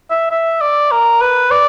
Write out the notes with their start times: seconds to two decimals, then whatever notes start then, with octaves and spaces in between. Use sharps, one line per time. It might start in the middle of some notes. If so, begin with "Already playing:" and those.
0.11 E5
0.31 E5
0.61 D5
0.92 A#4
1.21 B4
1.51 D5